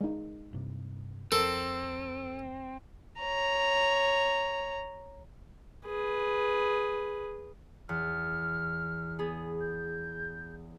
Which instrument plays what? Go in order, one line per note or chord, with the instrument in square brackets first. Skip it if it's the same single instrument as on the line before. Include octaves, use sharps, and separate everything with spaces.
[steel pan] G#3 D#4
[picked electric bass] G2 C3
[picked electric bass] F2 [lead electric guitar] C4 [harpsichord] A4 [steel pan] A#4
[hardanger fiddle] C#5 A#5
[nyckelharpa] G#4 B4
[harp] E2 [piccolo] F6
[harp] B3 G#4
[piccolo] G6